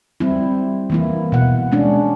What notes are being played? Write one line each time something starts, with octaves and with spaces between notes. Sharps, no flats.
G3 C4 E4
E3 A#3 E4
B2 F#5
G#3 C#4 D4